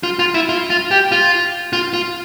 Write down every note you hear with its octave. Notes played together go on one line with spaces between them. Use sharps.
F4
F4
E4
F4
F4
G4
F4
F4
F4